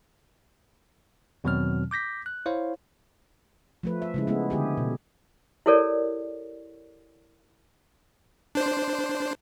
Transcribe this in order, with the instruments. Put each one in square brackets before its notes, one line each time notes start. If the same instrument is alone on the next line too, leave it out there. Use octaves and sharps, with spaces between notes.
[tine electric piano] E2 B2 D#3 F#3 C4 F6
D6 G6 A#6 B6
F#6
E4 C5 C#5 F5
[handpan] F3 A3 B4
E5
C#3 G#3 E4
G#3 A3 B3 E4
D3 G4 G#4
B2
[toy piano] E4 G4 A4 A#4 C#5 D5
[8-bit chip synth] D4 C5